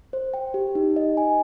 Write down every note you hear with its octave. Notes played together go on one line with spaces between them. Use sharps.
C5
G5
G4
D#4
D#5
G#5